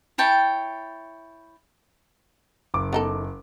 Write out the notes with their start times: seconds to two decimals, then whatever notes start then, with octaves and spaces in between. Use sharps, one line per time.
0.18 E4 C#5 G5 A5
2.74 F#1 D6
2.93 B3 D#4 A4